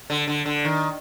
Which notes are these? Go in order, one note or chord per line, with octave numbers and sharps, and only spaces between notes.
D3
D3
D3
D#3